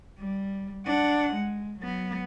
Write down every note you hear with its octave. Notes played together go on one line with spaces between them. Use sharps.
G3
D4 F#5
G#3
F#3 B3